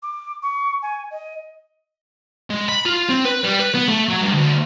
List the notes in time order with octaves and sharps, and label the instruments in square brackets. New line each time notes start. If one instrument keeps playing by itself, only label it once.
[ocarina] D6
C#6
G#5
D#5
[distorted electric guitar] G#3
B5
F4
C4
B4
G3
B4
B3
A3
F#3
G2
D2